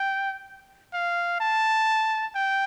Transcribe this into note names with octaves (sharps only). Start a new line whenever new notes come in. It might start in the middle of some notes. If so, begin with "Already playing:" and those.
Already playing: G5
F5
A5
G5